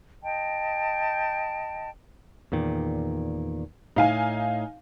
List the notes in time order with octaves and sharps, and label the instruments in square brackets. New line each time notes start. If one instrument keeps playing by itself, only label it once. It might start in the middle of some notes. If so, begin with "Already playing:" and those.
[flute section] D#5 G5 A5
[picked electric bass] E2 A#2 D#3
[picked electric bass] A2 [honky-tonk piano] D#4 F5 G#5